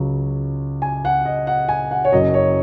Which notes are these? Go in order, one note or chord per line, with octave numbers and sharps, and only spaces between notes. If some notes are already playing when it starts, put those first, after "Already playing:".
Already playing: C#2 C#3 F#3
G#5
F#5
D#5
F#5
G#5
F#5
C#5
F#1 F#2 F#3 D#5
C#5